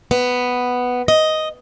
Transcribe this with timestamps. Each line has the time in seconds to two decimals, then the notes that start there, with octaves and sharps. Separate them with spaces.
0.11 B3
1.08 D#5